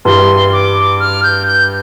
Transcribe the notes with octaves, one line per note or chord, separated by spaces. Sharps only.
G2 E3 G3 C6
D6
F6
G6
G6